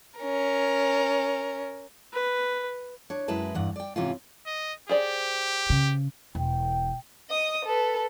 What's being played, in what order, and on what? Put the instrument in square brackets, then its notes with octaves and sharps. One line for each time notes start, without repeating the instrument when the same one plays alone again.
[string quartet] C#4 A#4
[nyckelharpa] B4
[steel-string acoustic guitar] D4 C#5
F#2 G#3 E4 B4 A5
E2 G2 F#5
D5 G5
G#2 C3 E3 C#4 E4 F4
[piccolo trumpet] D#5
[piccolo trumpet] G4 [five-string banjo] G#4 C5 D5
[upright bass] C#3
[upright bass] E1 [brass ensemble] G5
[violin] D#5 D#6
A4 B4